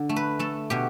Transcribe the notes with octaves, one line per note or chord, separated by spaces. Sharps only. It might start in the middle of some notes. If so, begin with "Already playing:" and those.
Already playing: D3
A3
B4
A3 A4
B2 G4